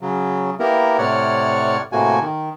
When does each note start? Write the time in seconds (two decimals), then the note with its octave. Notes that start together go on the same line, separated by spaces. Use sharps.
0.01 C#3 F#3
0.60 A#3 B3 E4 G4 A#4
0.98 A2 C3 C#5 D5 F#5 F6
1.92 A2 C3 A3 A#3 F#4 G#5
2.21 D#3